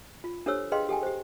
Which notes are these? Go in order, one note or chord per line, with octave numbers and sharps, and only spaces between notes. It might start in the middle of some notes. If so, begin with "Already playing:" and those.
F4
D4 G4 A4 C5 C#5 E6
G#4 B4 D#5 F5 G5 C6
G4 A4 G5 G#5
G4 C5